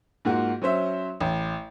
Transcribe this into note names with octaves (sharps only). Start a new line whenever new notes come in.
G#2 A#3 F4 F#4
F#3 C#4 C5 E5
A1